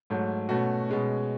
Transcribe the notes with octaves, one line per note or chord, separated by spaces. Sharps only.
G#2 F#3 A3
B2 A3 C#4 F#4
B2 G#3 C#4